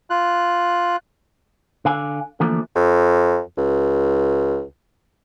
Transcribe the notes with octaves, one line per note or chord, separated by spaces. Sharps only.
F4 F#6
D3 F5 G#5
D3 E3 F3 A3 A#3
F2
C#2